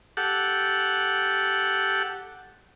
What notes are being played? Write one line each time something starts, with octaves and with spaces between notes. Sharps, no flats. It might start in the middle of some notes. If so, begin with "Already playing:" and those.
G4 A4 F#5